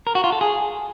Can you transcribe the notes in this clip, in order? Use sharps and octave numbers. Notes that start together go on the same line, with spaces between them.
A#4
F#4
F4
A4
G#4